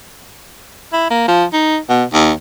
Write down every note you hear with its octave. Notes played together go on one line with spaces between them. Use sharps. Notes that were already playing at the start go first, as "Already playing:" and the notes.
E4
A#3
F3
D#4
B2
D#2